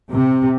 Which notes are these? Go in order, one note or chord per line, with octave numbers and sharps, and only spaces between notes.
C3